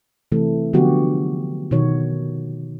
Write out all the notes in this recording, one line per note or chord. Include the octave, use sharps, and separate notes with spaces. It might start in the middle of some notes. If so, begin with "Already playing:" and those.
C3 E3 A3 A4
D3 F3 F#3 B3 F#4 G4
B2 D#3 F#4 C#5